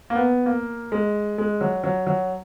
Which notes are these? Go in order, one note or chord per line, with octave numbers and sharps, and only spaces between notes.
A#3
B3
A#3
G#3
G#3
F#3
F#3
F#3